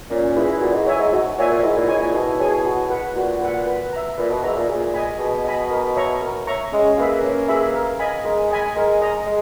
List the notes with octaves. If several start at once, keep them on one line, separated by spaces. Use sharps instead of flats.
A#2 C#4
E4 G#4 B4
A#2 F#4
G#2
C#5 E5 G#5
G#2
G#2 F#4
A#2 C#5 E5 G#5
A#2
G#2 E4
A#2
G#2 G#4 C#5 G#5
A#2
B2 E4
G#4 C#5 G#5
F#4
B4 F#5
A#2 F#4
B4 F#5
B4
E5 A#5
A#2 B4
B2
G#2 E5 A#5
A#2
A#2 G#4
D#5 G#5 B5
B2 G#4
D#5 G#5 B5
A#4
C#5 E5 A#5 C#6
A#4
C#5 E5 A#5 C#6
G#3 C#4
A#3 G#4 B4 E5 B5
C#4
G#4 B4 E5 B5
A#4
D#5 G#5 B5
G#3 A#4
D#5 G#5 B5
G#3 A#4
D#5 A#5
G#3